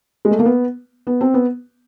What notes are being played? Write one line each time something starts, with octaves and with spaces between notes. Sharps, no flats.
G#3
A3
A#3
B3
B3
C4
B3